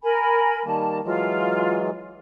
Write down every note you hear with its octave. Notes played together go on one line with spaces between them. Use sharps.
A#4 G#5 B5
D#3 G3 A#3 A5
E3 F#3 G#3 F4